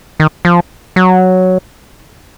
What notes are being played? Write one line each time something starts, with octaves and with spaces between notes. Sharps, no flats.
D#3
F3
F#3